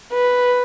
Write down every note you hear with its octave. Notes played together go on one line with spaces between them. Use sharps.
B4